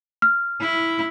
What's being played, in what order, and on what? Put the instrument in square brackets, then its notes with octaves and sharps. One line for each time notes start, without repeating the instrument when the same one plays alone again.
[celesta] F6
[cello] E4